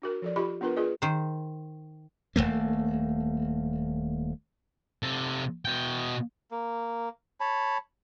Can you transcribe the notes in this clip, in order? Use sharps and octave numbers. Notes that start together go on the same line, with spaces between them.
D4 F#4 A#4
F3 A4 D5
F4 G4 D#5 B5
B3 D4 F4 A#4 B4
F4 G#4 B4 D5 D#5
D#3 C5
D#1 A2 A3 A#3
C3 A4
B2 G5
A#3
C#5 A5 B5